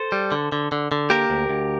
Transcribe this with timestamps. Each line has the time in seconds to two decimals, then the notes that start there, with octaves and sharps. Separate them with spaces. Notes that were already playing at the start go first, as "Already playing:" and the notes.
Already playing: A4 C5
0.12 G3
0.32 D3
0.52 D3
0.72 D3
0.92 D3
1.10 A#3 G4 A#4
1.30 D2
1.49 D2